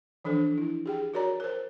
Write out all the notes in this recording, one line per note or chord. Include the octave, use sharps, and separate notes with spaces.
E3 F3 D4 A4 C5
E4
G4 G#4 G5
F#4 A#4 C#5 D5 A#5
A#4 C5